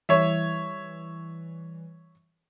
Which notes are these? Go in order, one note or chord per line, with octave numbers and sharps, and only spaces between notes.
E3 G3 C#5 E5